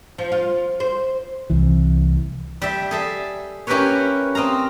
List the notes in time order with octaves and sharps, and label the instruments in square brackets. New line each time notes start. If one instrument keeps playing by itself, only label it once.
[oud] F3
F4
C5
[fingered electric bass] C2 E3
[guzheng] G3 E5
G#4 A4 E5
C#4 E4 G4 A#4 B4 C#5
C4 D#5 F5 A#5